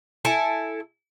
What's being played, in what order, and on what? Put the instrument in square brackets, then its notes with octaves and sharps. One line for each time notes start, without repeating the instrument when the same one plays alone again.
[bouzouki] E4 A4 G#5